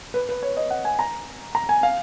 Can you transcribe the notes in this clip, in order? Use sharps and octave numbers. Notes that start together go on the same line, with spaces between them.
B4
B4
C#5
D#5
F#5
G#5
A#5
A#5
G#5
F5